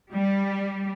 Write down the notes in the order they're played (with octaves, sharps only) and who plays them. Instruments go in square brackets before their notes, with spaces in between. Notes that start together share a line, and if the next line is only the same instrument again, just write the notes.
[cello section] G3